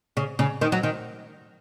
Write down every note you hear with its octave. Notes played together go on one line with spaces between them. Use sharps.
C#3
C#3
D#3
F#3
D#3